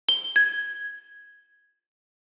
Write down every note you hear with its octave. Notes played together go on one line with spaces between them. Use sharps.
G7
G#6